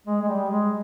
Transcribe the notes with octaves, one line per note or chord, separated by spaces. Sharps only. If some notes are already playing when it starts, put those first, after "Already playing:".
G#3
G#3
G3
G#3